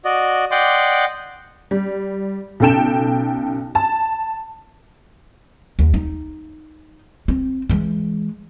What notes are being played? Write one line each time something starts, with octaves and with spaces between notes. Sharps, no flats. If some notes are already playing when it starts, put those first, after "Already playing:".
F#4 D5 D#5
D5 D#5 F#5 G5 C6 D6
G3
B1 C#3 A4 G5 E7
A5
D#2
D#4
C4
E3 G#3